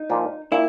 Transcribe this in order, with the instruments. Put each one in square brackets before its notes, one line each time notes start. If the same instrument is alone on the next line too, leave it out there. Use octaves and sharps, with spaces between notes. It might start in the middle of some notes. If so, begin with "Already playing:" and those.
Already playing: [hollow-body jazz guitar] D#4
[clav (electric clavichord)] A#2 F3 A#3
[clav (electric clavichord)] A#2 [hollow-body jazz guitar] E4